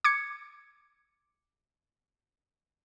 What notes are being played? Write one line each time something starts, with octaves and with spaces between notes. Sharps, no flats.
D6 G#6 C#7